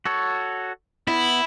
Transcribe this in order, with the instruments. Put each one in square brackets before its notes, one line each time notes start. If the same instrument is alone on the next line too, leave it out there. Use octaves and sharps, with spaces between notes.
[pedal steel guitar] F#4 A4 C#5
[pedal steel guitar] B3 [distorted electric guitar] E4